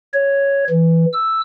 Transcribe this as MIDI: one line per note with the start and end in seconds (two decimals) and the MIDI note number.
0.14 0.64 73
0.70 1.05 52
1.13 1.41 88